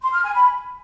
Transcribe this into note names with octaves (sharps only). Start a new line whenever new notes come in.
C6
F6
G#5
B5